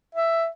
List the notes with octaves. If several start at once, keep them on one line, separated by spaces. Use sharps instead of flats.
E5